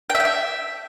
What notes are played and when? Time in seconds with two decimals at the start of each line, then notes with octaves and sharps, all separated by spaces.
0.10 G5
0.15 E5
0.20 G5
0.25 E5